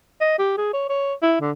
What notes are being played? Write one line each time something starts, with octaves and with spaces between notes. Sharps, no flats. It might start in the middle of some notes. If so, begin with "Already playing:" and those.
D#5
G4
G#4
C#5
C#5
E4
D3